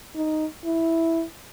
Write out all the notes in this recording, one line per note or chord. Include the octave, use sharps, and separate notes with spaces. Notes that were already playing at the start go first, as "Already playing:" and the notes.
D#4
E4